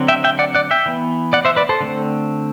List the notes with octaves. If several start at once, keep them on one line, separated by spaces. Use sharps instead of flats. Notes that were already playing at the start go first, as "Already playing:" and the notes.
Already playing: D3 F#3 C4
E5 G5
E5 G5
D5 F#5
D5 F#5
E5 G5
E3 B3
D5 F#5
C5 E5
B4 D5
A4 C5
D3 A3 C4